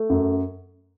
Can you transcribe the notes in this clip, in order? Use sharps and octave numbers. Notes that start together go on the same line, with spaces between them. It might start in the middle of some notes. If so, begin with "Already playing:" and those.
Already playing: A3
F#2